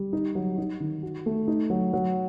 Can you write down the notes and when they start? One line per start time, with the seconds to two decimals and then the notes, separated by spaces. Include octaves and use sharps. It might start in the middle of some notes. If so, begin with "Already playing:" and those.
Already playing: G3
0.13 D#4
0.35 F#3
0.58 D#4
0.80 D#3
1.03 F#4
1.26 A3
1.48 D#4
1.70 F#3
1.93 F#3